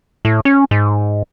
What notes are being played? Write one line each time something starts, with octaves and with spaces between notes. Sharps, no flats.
A2
C#4
G#2